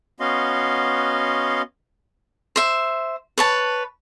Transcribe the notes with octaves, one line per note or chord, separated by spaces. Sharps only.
B3 C#4 F#4 D#5 F5 C6
C5 E5
B4 C#5 A5